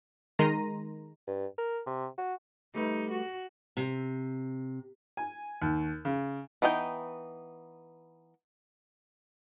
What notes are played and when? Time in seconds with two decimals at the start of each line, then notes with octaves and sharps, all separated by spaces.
0.39 D#3 G#3 A#5 C6 A#6 D#7
1.27 G2
1.58 A#4
1.86 C3
2.18 F#4
2.75 G3 A3 D#4 B4
3.11 F#4
3.77 C3
5.17 G#5
5.62 D#2
6.05 C#3
6.62 E3 B3 D#4 E4 G5